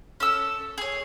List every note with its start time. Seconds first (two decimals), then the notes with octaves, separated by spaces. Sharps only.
0.20 C#4 A4 E6
0.78 G#4 C#5